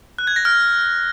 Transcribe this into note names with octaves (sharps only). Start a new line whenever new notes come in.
F#6
G#6
A#6
F6